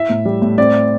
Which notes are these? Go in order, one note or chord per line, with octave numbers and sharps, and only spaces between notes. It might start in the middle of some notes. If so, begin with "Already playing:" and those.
Already playing: E4 E5
A2
G3
A2
C4 D5